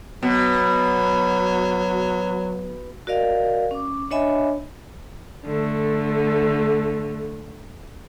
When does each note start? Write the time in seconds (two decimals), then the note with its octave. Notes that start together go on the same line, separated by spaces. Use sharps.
0.23 B2 F#3
3.07 F#4 A#4 D5 D#5 F5
3.71 C#4 D6
4.11 D4 C#5 D#5 E5 G#5 B5
5.45 D3 A3